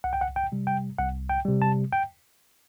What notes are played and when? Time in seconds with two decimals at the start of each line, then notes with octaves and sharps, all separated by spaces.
0.04 C2 F#5
0.13 G5
0.21 F#5
0.36 G5
0.52 C3 G3
0.67 G5
0.98 C2 F#5
1.30 G5
1.45 C3 G3
1.62 A5
1.92 G5